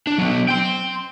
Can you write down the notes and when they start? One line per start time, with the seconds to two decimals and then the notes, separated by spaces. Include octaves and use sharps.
0.07 D4
0.18 F#3 B3
0.48 G5 C6